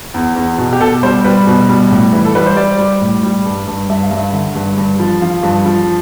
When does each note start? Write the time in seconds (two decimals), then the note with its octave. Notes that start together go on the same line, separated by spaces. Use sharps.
0.14 E2
0.36 E2
0.58 B2
0.73 G4
0.80 B2 A4
1.03 G3 C5
1.24 G3 B4
1.47 B2
1.69 G3
1.91 A2
2.13 E3
2.25 A4
2.35 G3 B4
2.46 C5
2.56 G3 D5
2.79 G3
3.01 A2
3.23 G3
3.45 G2
3.68 G2
3.89 G2 E5
4.03 F5
4.11 G2
4.16 E5
4.33 D3
4.55 G2
4.78 G2
5.00 F3
5.22 F3 F5
5.43 G2
5.65 F3